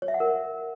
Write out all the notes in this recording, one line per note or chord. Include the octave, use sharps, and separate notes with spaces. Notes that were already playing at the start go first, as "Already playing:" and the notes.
C#5
E5
F#5
A#4